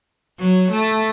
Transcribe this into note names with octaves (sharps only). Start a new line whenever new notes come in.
F#3
A3